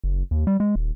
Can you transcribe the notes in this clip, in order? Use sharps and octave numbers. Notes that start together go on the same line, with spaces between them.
F#1
D#2
G3
G#3
D#1